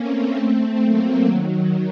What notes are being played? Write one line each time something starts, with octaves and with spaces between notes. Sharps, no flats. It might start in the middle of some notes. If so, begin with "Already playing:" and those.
Already playing: A3 A#3 C4 C#4
A3 C4
F#3 A#3
D#3 F#3